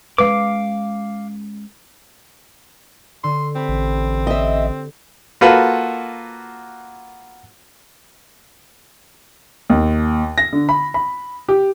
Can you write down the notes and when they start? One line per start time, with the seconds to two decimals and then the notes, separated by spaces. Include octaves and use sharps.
0.18 G#3 C#4 B4 F5 D6
3.24 D3 C6
3.55 C4 G4 B5
3.69 A1
4.27 D#5 E5
5.41 A#3 F4 F#4 A4 B4
9.70 D#2
10.38 A#6
10.53 D3
10.69 B5
10.94 B5
11.48 G4